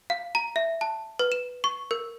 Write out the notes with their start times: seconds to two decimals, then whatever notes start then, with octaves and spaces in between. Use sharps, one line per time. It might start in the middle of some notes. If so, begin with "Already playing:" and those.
0.10 F5
0.35 A#5
0.56 E5
0.81 A5
1.19 B4
1.32 E7
1.64 C#6
1.91 A#4